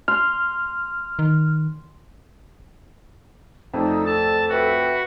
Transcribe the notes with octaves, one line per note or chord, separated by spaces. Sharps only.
C6 F6
D#3
F2 A3 D#4 D5 E6
A4 A5
F#4 B4 E5 G5